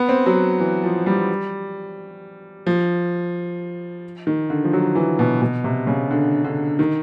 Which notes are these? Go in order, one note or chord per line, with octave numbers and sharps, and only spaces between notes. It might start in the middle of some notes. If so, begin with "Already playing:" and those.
Already playing: B3
C4
F#3
E3
F3
G3
F3
D#3
D3
F3
F#3
E3
B2
B2
C3
C#3
D3
D3
D#3